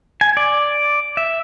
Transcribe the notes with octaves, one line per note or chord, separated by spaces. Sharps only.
G#5
D5
E5